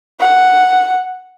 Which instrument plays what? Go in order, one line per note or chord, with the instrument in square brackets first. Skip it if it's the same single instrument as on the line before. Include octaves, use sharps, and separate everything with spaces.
[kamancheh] F#5